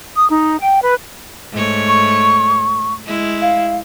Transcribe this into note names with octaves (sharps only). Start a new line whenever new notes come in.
D#6
D#4
G5
B4
G#2 A3 C#5
C#6
G#3 E4
F5